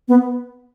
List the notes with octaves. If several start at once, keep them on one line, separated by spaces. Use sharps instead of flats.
B3